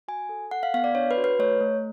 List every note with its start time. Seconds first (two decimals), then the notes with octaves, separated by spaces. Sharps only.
0.08 F#4 G#5
0.29 A4
0.51 A4 F#5
0.63 F5
0.74 B3 F5
0.84 D5
0.95 D4 C#5
1.11 B4
1.17 F#4
1.24 B4
1.39 A3 C#5
1.60 A3